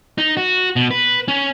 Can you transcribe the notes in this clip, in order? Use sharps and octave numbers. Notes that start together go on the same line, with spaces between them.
D#4
F#4
B2
B4
C#4